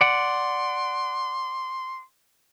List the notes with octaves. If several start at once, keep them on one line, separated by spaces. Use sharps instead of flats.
D5 F#5 C6